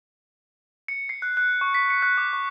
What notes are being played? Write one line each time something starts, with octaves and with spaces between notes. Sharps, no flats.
C#7
C7
F#6
F#6
C#6
B6
C#7
F#6
D6
C#6